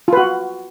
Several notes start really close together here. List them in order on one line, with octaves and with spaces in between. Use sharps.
F4 B4 F#4